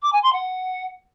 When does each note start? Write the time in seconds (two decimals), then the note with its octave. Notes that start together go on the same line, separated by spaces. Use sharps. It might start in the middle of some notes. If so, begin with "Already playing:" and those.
0.02 D6
0.12 G#5
0.23 C6
0.33 F#5